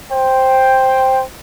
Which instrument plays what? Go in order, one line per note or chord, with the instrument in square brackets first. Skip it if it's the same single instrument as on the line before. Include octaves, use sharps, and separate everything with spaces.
[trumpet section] C5 G5